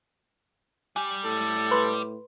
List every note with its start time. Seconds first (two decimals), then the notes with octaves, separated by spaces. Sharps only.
0.96 G3 G4 G#5
1.25 A2 A4
1.71 B4 B5 C6